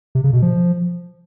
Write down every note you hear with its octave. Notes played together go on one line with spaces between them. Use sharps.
C3
C#3
B2
F3